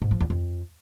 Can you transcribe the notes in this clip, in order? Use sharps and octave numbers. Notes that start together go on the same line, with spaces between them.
G#2
F3
E2
F2